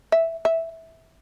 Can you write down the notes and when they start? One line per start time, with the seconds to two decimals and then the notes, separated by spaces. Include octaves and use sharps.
0.12 E5
0.45 E5